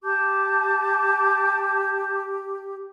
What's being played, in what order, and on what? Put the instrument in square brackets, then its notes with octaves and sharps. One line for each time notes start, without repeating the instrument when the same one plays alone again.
[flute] G4 [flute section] A5 D6 G6